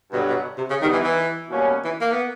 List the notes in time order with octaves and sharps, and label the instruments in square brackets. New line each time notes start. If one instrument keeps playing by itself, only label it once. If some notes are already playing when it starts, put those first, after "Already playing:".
[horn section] G2 D3 F#3 [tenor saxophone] B2
[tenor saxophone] B2
C3
C#3
[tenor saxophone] D#3 [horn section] G3 B3 D#4
[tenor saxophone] E3
E3
[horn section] B2 G3 A#3 C#4
[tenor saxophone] E3
A#3
B3